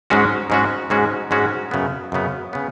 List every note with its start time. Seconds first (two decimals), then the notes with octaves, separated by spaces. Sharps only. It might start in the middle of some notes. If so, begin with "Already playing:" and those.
0.10 G#2 G#3 C#4 F#4
0.50 G#2 G#3 C#4 F#4
0.90 G#2 G#3 C#4 F#4
1.31 G#2 G#3 C#4 F#4
1.71 F#2 C#3 B3
2.12 F#2 C#3 B3
2.53 C#3 B3